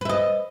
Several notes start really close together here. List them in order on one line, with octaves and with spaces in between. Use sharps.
B4 E5 D#5